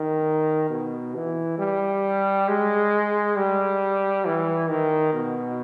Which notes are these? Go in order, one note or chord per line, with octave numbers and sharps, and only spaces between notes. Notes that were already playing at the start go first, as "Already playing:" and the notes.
Already playing: D#3
B2
E3
G3
G#3
G3
E3
D#3
B2